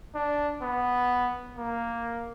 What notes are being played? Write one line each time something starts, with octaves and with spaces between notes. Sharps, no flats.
D4
B3
A#3